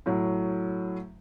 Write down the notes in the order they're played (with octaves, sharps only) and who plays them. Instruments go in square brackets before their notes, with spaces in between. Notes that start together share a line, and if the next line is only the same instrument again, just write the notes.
[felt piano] A2 F#3